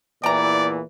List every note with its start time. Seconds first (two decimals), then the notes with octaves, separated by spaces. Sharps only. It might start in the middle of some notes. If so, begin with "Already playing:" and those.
0.24 E2 A#2 E3 D5 G5 A#5